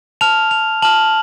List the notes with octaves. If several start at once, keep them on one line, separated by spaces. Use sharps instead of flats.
A5 F6 F7
F7
A5 F6 F#7